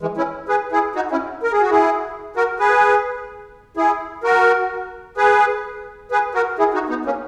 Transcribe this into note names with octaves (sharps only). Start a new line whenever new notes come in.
E3 G#3
C#4 E4
G#4 B4
E4 G#4
D#4 F#4
C#4 E4
A#4
G#4
F#4
E4 G#4
F#4 A#4
G#4 B4
E4 G#4
F#4 A#4
G#4 B4
G#4 B4
F#4 A#4
E4 G#4
D#4 F#4
B3 D#4
A#3 C#4